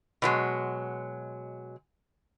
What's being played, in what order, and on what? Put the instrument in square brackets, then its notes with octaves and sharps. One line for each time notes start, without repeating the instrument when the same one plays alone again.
[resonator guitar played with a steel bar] B2 F#3 G#3